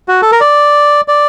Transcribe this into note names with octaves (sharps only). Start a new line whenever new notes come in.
F#4
A4
A#4
D5
D5